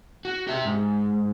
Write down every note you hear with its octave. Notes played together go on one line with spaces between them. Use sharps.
F#4
G4 E5
G#2